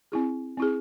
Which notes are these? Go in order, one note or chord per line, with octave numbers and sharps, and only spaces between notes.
C4 E4 G#4
C4 E4 G#4